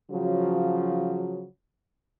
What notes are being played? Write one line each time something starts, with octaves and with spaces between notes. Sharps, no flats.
C#3 F3 F#3